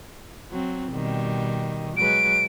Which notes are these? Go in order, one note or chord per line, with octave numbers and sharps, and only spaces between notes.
F#3 C4
B2 D#3 G3
F#3 G#3 B4 D7